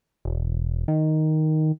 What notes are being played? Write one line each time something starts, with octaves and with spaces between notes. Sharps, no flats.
E1
D#3